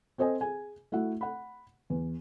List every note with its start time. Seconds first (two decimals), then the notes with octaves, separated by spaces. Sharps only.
0.18 C4 A4 C5 D#5 G#5
0.41 G#4 G#5
0.92 A3 E4 F#4 F#5
1.21 F#5 B5
1.90 E2